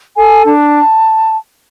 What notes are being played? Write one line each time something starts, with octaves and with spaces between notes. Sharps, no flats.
A4 G#5
D4 A5